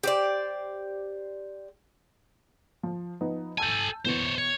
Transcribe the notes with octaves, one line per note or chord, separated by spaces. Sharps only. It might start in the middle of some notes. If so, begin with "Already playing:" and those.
G4 C5 D5
F3
F3 B3 D#4
A4 G#5 A5 E6 G6
B2 E3 B3 C5 C#5
C#5